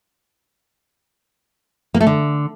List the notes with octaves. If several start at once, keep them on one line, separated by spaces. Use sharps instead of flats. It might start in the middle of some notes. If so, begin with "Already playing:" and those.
A#3
A3
D3